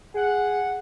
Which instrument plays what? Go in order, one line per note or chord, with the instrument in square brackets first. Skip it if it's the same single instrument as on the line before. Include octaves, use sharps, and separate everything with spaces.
[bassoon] G#4 [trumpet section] F#5